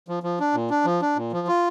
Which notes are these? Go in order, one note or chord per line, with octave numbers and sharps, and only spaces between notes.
F3
F3
D4
A#2
D4
F3
D4
A#2
F3
F4